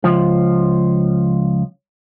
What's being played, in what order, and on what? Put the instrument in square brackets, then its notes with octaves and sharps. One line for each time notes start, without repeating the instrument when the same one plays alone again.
[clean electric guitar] C#2 F3